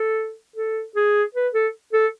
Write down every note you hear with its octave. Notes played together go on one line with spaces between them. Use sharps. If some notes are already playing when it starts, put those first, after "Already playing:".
Already playing: A4
A4
G#4
B4
A4
A4